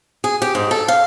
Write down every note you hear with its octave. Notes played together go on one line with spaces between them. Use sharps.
G#4
G4
G#2
A4
F5